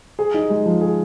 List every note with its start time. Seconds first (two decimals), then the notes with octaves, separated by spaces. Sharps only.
0.19 G#4
0.34 D#4
0.50 G#3
0.66 F3
0.81 G#4